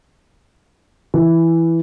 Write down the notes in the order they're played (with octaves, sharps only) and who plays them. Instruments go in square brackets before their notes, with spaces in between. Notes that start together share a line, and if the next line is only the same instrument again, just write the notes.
[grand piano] E3